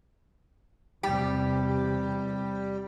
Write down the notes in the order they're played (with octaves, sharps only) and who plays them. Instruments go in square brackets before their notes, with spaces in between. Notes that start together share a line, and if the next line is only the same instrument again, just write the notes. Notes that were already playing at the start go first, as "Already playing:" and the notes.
[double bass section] E2 C3 [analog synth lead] G3 [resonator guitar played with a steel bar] G4